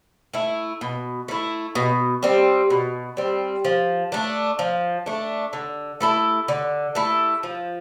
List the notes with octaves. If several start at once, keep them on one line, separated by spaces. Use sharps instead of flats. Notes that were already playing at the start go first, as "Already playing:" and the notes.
A3 E4
B2
A3 E4
B2
G3 C4
B2
G3 C4
F3
A3 D4
F3
A3 D4
D3
A3 E4 A4
D3
A3 E4 A4
F3